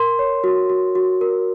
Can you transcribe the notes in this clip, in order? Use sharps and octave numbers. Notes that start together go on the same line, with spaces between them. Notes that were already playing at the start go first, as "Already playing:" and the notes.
Already playing: A#4 C6
C#5
F#4
F#4
F#4
A#4